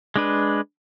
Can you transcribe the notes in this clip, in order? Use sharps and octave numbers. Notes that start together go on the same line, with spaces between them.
G#3 D4 B4